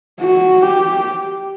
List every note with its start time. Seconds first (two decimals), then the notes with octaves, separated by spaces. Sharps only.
0.21 F#4
0.62 G4